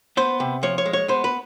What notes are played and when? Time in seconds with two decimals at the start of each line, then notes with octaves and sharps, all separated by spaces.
0.17 B3 C5
0.40 C3
0.63 F3 C#5
0.78 C#5
0.86 G#3
0.93 C#5
1.08 B3 C5
1.24 B4